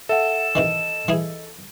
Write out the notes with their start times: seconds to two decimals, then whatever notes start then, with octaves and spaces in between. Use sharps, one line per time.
0.09 A4 E5 F#5 E7
0.55 C3 D#3 E3 D#5
1.08 E3 E4 G#4